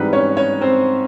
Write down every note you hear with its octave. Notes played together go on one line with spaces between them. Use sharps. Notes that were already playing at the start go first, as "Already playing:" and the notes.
Already playing: G#2 E3 G3 C4 B4
C#4 C#5
C#4 C#5
C4 C5